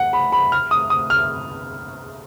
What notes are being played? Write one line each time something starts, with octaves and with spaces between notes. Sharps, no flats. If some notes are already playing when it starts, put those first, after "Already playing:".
Already playing: F#5
B5
B5
F6
D#6
D#6
F6